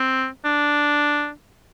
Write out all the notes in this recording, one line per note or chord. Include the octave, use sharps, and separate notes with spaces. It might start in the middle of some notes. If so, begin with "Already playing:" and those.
Already playing: C4
D4